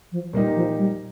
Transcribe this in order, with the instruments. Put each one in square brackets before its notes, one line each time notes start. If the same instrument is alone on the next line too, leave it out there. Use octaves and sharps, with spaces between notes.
[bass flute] F3
[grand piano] A#2 A#3 D#4 G4 [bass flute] G3
[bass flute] F3
G3